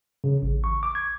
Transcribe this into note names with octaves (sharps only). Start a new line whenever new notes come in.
C#3
A1
C#6
D6
G#6